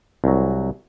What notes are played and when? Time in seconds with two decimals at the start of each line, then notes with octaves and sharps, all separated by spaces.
0.24 C2 F#3